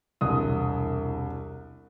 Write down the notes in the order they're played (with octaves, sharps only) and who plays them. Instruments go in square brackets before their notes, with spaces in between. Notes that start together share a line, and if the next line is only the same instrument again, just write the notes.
[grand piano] E1 C2 D#6